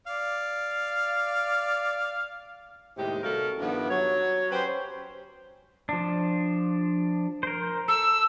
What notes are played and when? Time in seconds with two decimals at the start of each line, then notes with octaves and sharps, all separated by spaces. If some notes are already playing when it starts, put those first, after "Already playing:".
0.07 D5 F5
2.97 D#2 A2 C3 G#3 D#4 G4
3.24 C3 G3 F#4 A4 A#4 F5
3.58 G2 D#3 F3 B3 D4 E4
3.90 F#3 C#5
4.51 C#4 G4 B4 C5
5.89 F3 D4
7.43 A#4 C5
7.88 A4 E6